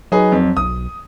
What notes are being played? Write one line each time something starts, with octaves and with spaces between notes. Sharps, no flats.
F#3 D#4 G#4 B4
F2
B1 D#6